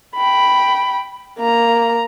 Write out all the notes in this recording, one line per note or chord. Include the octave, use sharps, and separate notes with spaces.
G5 B5
A#3 A#5